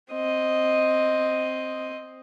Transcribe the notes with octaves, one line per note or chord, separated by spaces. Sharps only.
C4 D#5